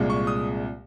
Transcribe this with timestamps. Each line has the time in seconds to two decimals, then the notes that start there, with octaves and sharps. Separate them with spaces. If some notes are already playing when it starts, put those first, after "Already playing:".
Already playing: C2 A#2 G#3
0.10 C#6
0.27 D#6